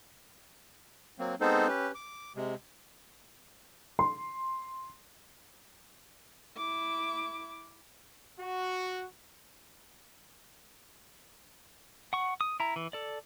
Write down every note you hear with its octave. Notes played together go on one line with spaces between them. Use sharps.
F#3 A#3 C4
G#3 B3 C4 D#4 A4 C5
C#4 G4 B4
D6
C3 G#3
C6
E4 D6
F#4
F#5 C#6
D#6
E4 A#5
E3
A4 D5